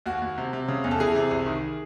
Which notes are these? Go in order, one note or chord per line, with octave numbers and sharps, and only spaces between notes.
D#2 F#4
D#2
C3
C3
C#3
E2
A4
E3 G#4
C3
C2
D#3